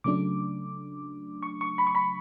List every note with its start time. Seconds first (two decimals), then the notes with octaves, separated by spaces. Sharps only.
0.04 C#3 F#3 A3 D4 D6
1.43 C#6
1.61 C#6
1.78 B5
1.87 C#6
1.95 B5